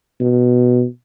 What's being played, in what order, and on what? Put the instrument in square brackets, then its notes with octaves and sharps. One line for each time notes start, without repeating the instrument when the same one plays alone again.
[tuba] B2